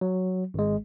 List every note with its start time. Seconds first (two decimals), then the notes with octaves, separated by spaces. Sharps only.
0.01 F#3
0.54 G#1 G#3